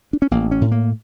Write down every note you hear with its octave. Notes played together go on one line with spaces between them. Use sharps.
D4
C#4
A1 A#3
C#4
A2
A#3